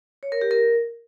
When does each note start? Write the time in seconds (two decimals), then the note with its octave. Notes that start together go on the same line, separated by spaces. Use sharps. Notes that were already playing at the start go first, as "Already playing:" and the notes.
0.23 C#5
0.32 A#4
0.41 G4
0.51 A#4